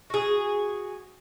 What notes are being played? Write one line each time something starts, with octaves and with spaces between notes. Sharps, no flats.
F#4 G#4